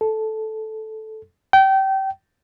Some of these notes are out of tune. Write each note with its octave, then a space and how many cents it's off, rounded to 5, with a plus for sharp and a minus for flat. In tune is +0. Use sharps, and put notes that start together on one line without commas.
A4 -10
G5 -25